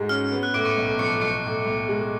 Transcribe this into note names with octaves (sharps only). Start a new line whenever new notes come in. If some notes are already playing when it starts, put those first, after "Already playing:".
Already playing: G#2 G#3 F#4
C#4 F6
B3
F#6
A2 D6 D7
C#6 C#7
B1
F3 C#6 C#7
B1 C#6 C#7
A2
B1
G#3